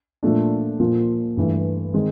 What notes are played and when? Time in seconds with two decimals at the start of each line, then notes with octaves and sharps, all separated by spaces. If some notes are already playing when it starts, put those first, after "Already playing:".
0.23 A#2 F3 A3 D4
0.80 A#2 F3 A#3
1.37 G2 E3 A3
1.94 D#3 G#3 C4